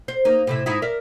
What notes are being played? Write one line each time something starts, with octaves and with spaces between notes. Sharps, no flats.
C5
A#3 D#4
A2 C3 E4
G#2 D#4 E4
A#4 D5 E5